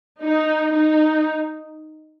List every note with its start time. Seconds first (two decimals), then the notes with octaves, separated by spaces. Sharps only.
0.22 D#4
0.74 D#4